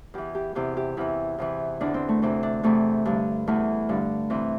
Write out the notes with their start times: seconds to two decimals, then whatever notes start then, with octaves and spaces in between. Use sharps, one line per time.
0.14 E2 E3 G4
0.35 G4
0.55 E2 C3 E3 G4
0.77 G4
0.97 E2 C3 E3 E4
1.38 E2 C3 E3
1.81 E2 D3 D4
1.94 C4
2.09 A3
2.22 D2 C3 E3 C4
2.43 D4
2.63 E2 C3 E3 A3
3.05 G2 D3
3.47 E2 E3 A3
3.89 G2 D3
4.30 C3 E3 C4